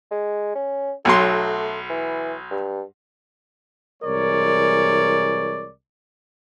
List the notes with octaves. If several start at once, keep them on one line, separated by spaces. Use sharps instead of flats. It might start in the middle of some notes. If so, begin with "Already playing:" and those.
G#3
C#4
B1 F#3 A3 C6
E3
G2
C2 E3 G#3 A#4 C#5 D5